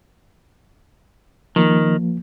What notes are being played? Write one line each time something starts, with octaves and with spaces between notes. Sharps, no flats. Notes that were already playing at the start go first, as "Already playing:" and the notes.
D#3 F3 A#3